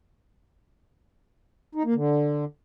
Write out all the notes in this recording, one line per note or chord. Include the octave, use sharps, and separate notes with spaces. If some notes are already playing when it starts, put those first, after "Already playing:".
D#4
A#3
D3